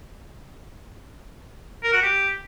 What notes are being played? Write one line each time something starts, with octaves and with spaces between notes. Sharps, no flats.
A#4
F#4
G4